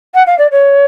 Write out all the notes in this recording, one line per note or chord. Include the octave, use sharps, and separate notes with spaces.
F#5
F5
D5
C#5